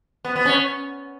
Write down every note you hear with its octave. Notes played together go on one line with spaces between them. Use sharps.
B3
B3
C#4